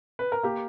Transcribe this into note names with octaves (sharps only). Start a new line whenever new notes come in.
B4
A#4
A#3 G4